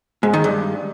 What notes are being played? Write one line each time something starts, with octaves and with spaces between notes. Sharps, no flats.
G#2
D#3
G2